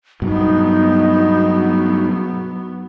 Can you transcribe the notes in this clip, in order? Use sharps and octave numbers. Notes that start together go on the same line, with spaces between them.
G2 B2 F#3 B3 D#4